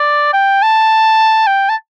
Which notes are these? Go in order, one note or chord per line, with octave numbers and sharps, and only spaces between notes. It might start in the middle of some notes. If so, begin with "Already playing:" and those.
Already playing: D5
G5
A5
G5
A5